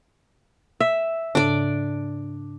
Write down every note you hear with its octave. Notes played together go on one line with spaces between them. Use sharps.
E5
G#2 C#3 D4 A4 D5